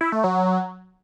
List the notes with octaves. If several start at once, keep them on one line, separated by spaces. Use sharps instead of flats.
E4
A3
F#3